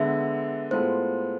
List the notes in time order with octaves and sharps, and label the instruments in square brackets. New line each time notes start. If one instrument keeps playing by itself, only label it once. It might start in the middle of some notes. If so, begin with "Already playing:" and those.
Already playing: [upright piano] D3 G#3 B3 [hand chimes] E5
[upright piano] A2 G#3 B3 F4 A4 [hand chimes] C5